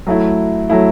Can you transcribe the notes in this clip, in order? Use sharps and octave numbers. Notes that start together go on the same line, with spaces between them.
F#3 A3 E4
F#3 A3 E4